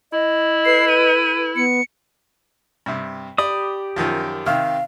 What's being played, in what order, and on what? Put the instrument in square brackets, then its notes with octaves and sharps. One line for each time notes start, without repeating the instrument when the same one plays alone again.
[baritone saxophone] E4 [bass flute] D#5
[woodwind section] A4 B4 [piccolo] C7
[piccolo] D#7
[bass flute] B3 [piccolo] C#7
[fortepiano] G2 C3
[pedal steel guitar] G4 B5 D#6 [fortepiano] D5
[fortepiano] F#2 D#3 F3
[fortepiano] C3 D#3 F6 [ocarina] F5